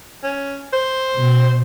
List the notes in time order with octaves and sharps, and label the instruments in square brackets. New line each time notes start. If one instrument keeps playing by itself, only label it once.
[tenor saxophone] C#4
C5
[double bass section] B2